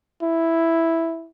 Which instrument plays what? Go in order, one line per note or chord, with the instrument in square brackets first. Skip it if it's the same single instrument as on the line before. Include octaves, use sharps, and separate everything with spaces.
[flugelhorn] E4